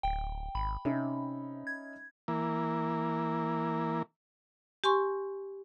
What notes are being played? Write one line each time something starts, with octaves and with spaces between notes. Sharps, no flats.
D1 G5
G#1 B5
C3 C#4 D#4 E5
G#6
E3 A#3
G4 G#5 C6 C#6